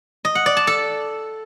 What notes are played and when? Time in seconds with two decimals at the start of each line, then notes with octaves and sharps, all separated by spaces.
0.25 D#5
0.35 F#5
0.46 D5
0.57 A5
0.67 A4